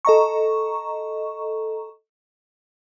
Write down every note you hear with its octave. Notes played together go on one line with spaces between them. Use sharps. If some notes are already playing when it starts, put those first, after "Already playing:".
A4 D#5 A#5 C#6